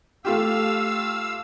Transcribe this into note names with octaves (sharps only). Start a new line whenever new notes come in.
A3 F4 G4 F5 E6